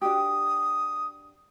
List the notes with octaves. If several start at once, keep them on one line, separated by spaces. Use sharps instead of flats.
D4 F#4 G4 D#6